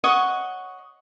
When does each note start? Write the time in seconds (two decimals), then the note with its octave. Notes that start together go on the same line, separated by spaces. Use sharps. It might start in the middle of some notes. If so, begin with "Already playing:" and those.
0.04 C#5 D#5 F#5 C#6